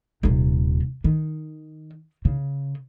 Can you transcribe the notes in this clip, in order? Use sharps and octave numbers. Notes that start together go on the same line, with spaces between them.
D#1 C3
D#3
C#3